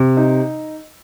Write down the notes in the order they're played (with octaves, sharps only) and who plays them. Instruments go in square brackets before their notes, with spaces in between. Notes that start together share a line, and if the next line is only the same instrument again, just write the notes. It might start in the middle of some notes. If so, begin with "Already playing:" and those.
Already playing: [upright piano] C3
D#4